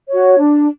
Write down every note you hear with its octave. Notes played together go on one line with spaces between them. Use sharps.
F#4 C#5
D4